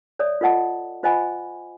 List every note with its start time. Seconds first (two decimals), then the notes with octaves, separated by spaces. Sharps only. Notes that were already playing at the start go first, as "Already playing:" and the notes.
0.19 C#5 D5 E5 D#6
0.41 F4 A4 D#5 F#5 A5
1.03 F4 C5 D#5 F#5 G#5 B5